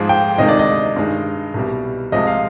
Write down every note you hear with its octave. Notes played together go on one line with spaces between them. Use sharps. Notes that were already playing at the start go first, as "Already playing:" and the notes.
Already playing: G#2 F3 G#3 C5
G5
D2 C3 D#3 G#3 D#5
D5
D#5
G2 D#3 G#3
C2 B2 G3
C2 C3 F3 G#3 D#5
F5